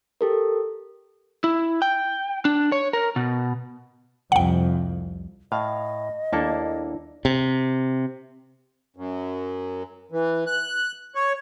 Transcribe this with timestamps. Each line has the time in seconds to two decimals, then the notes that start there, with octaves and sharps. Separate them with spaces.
0.21 G4 A4 A#4
1.44 E4
1.82 G5
2.45 D4
2.72 C#5
2.93 A#4
3.16 B2
4.32 C2 F2 F#5 G5
5.52 A2 D#5 F5
6.33 D#2 A#3 D4 E4 A4
7.25 C3
8.97 F#2
10.12 E3
10.47 F#6
11.15 C#5